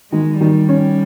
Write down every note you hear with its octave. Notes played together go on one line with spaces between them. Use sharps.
D#3 G#3
D#3 G3
C#4